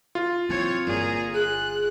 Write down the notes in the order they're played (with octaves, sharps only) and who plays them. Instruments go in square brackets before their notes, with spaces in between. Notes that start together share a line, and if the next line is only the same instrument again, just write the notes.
[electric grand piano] F4
[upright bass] F#3 E4 [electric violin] C4 C#5
[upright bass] G1 [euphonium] A#2 [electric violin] G#4 A#5
[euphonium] G#4 [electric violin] F#6